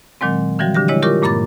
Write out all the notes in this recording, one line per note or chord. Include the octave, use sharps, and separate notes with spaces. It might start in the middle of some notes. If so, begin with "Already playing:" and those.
A#2 D#3 F#3 G#3 C4
D3 E3 F3 G3 F#4
D3 D4 G4 A#6
G#3 E4 C#5 D#5
F4 G4 A#4 C#6 D6
G2 A#2 A#3 B5 D6 A6